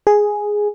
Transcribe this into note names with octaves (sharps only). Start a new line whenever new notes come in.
G#4